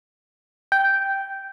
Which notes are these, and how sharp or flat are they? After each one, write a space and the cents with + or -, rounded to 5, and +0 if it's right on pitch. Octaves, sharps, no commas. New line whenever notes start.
G5 -5